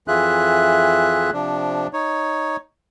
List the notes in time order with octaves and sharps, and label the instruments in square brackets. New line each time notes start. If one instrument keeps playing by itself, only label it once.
[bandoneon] F2 E3 F4 G#4 E5 F#6
C3 F3 D4
D#4 C#5